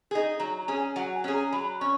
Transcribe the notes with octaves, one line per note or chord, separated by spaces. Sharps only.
D#4 G#4
F#3 A#5
A#5
C#4 G#4
G#5
F#3 F#5
G#5
C#4 G#4
A#5
F#3 B5
C#4 C#6